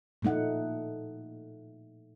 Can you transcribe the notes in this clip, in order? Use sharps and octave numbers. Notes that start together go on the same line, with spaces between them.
A#2 F3 A3 D#4 F#5